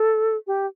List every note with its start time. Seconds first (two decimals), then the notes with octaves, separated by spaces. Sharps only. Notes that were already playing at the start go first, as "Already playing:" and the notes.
Already playing: A4
0.47 G4